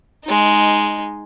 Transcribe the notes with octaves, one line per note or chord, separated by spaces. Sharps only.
G#3 D#4